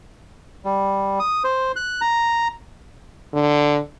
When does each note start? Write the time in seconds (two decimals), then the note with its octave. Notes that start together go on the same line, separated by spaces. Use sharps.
0.65 G3
1.20 D#6
1.44 C5
1.76 F#6
2.01 A#5
3.34 D3